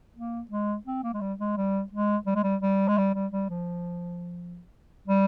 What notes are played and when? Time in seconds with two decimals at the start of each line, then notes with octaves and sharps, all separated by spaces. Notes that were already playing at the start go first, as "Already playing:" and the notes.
0.17 A#3
0.51 G#3
0.87 C4
1.04 A#3
1.14 G#3
1.21 G3
1.40 G#3
1.57 G3
1.92 G#3
2.27 G3
2.36 G#3
2.43 G3
2.62 G3
2.88 G#3
2.98 G3
3.15 G3
3.32 G3
3.50 F3
5.08 G3